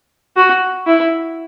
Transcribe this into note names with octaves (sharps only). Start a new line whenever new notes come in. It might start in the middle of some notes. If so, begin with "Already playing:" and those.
F#4
E4